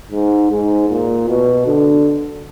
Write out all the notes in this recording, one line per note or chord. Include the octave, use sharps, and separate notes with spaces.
G#2
G#2
A#2
B2
D3